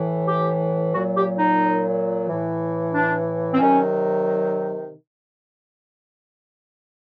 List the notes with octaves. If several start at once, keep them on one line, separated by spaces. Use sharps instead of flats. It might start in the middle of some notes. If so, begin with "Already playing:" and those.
Already playing: A2 E3
G4
A#2 F#3 F#4
G4
D#4
A2 E3
D4
C4
C3 D#3 F#3 C#4